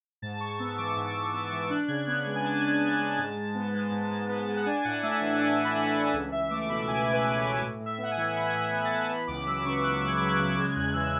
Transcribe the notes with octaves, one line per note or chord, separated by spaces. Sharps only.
G#2 A5
G#2 C#6
B3 E6
C#6
E3 D6
G#2 D6
D6
G#2 C#6
B3 C#6
E3 D6
D4 F#6
C#3 G#6
B3 F#6
G#3 F#6
G#5
D4 A5
C#3
B3
G#3
G#2
G#2
B3
G#3
G#2
G#2
B3
G#3
F#5
D4 G#5
A2 F#5
A3 E5
A5
E3 G#5
D4 G#5
A2
B5
A3
E3
C#2
C#2 E5
A3 D6
B2 B5
C#2 G#5
C#2
B4
A3
C#5
B2
A2
A2
E5
B3 F#5
G#5
E3
A2 B5
A2
G#5
B3
A5
E3
B3 B5
C#2 D6
F#3 E6
B5
C#3 C#6
B3 F#6
C#2
G#6
F#3
F#6
C#3
G#3 G#6
E2 F#6
E3 E6